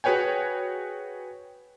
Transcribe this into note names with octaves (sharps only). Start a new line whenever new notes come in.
F#4 G#4 B4 C#5 G5 G#5